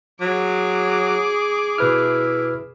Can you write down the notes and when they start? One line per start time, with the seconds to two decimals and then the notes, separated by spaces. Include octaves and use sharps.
0.21 F#3 G#4 D6
1.78 B2 E4 B4 F6